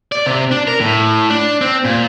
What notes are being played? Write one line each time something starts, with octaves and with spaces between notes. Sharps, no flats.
D5
C3
D4
A#4
A2
D4
C4
A#2